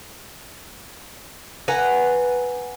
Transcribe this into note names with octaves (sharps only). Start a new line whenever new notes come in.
B4 F#5 G#5 A#5